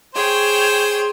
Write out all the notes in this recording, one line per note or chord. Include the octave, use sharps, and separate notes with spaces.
G#4 C5 C#5 G5